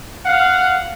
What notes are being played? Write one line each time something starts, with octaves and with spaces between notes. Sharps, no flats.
F5 F#5